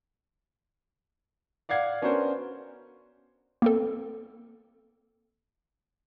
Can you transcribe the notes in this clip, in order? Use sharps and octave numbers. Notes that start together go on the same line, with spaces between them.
D5 F5 F#5 G#6 C7
B3 C#4 D4 F#4 A#4 C5
A#3 C4 A4